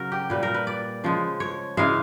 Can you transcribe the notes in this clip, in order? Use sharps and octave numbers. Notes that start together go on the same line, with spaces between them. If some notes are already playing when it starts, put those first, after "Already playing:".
Already playing: C#3 F#3 A#4
G4
A#2 G3 B4
A#4
B4
D5
C#3 F3 G#3
C#5
C#3 E3 G#3 F5